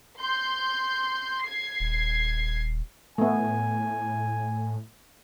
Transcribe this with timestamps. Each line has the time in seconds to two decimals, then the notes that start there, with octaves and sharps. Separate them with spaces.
0.19 C6 G6
1.42 G#6 C7
1.80 D#1
3.18 A2 A3 B3 G#5